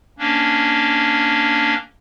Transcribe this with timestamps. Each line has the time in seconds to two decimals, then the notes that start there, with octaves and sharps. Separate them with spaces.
0.19 A#3 C#4 D4